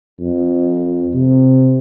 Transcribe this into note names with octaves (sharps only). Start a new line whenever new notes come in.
F2
C3